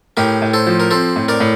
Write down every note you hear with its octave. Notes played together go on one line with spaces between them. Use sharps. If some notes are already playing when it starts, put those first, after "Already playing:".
A2 G4 A#4
A2
A4 C5
F3
A#4
C4 A4 C5
A2
A#4 D5
A2